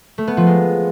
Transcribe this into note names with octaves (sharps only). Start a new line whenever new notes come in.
A3
B3
F3
G#3